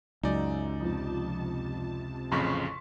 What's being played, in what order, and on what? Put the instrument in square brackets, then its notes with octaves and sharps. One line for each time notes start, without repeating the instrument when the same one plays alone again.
[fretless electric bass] C#2 [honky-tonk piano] F#2 [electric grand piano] D#4 D5
[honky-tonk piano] F2 F3 [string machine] C3 A5
[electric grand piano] A1 F2 C#3 [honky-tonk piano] C6 C#6 B6